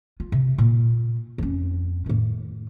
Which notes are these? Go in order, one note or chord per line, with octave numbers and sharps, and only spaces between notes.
F4
C3
A#2
F2 C#4
A2 D#3